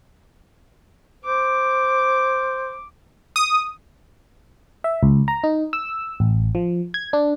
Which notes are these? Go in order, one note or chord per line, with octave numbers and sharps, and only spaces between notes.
C5 D6
D#6
E5
C#2
A#5
D#4
E6
A1
F3
G#6
D4